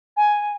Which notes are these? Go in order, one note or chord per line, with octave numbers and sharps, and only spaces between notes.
G#5